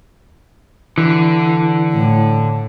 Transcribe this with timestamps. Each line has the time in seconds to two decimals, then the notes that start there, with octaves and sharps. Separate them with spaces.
0.98 D3 E3
1.93 A2